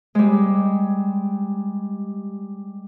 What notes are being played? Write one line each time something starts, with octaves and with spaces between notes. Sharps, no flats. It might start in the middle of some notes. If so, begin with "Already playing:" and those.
G3 G#3